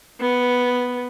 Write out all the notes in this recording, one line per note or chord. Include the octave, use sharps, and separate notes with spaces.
B3